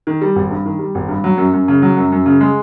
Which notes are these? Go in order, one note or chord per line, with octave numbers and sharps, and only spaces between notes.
D#3
G3
G#1
G2
D#3
G3
G#1
G2
F#3
F#2
F#2
C#3
F#3
F#2
F#2
C#3
G#3